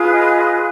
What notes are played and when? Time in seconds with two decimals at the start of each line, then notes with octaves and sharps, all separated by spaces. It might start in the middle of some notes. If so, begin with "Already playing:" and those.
Already playing: F4 G#4 B4
0.11 D#5